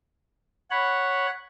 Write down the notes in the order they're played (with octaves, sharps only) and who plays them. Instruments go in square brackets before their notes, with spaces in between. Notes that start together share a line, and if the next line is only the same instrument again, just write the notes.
[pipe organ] C#5 B5 [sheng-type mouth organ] F#5